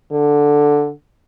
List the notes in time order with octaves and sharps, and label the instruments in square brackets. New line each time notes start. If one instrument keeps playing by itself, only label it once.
[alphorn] D3